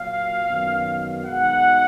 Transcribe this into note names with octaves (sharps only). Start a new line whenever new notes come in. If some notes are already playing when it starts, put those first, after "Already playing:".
Already playing: A#2 F#3 A#3 F5
F#2 D#3 F#3 B3
B2 G#3 D#4 F#5